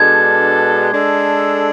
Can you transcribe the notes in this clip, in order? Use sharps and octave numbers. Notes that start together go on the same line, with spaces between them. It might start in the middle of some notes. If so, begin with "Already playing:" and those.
Already playing: B2 G#3 D4 A4 G#6
G#3 D4 A4